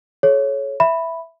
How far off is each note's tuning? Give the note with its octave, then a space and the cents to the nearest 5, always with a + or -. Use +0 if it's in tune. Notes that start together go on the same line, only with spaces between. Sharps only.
A4 -45 C#5 -5
E5 +5 B5 +0